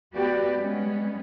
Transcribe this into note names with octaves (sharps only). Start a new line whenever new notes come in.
A3 B3 F#4 G4 B4 D5
G3 G#3 B3 C#4